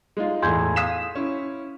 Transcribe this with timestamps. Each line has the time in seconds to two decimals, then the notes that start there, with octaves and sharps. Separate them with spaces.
0.17 G#3 D#4 F4
0.42 E2 A2 C6 G6 G#6
0.76 F5 D#6 B6 E7
1.15 C#4 E4